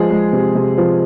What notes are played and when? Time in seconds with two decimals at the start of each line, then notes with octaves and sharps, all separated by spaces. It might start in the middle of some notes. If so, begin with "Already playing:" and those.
Already playing: F3 G#3 G#4
0.11 G#3
0.33 C3
0.55 C3
0.78 F3